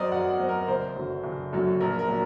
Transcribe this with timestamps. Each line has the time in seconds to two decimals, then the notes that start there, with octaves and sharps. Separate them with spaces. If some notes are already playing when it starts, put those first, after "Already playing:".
Already playing: F#2 F#3 C4 A#4 D5 D#5
0.12 F#2 F#5
0.30 F#5
0.40 F#3 C4
0.49 A#4
0.68 F#1 C5
0.96 F#2 D3 F#3
1.24 F#1
1.53 F#2 D3 F#3
1.80 A#1 A#4
1.99 A#4
2.08 A#2 F#3